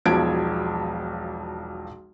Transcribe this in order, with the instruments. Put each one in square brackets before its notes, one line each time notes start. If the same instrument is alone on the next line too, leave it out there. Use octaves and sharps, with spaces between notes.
[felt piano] E1 B1 F3 G#6 D7